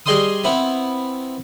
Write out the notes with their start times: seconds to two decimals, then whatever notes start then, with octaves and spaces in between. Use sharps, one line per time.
0.06 G3 G#4 D#5 G5 C6 D#6
0.44 B3 C4 E4 B5